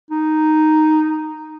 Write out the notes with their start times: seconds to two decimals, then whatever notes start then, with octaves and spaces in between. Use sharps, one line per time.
0.11 D#4